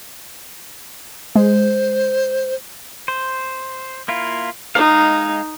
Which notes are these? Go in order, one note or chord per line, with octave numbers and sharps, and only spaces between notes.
G#3 C5
C5
A#3 E4 F4
G#3 D#4 F5